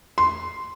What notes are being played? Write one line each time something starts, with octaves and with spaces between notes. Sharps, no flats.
C6